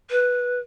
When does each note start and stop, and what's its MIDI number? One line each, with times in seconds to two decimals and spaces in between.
0.11 0.60 71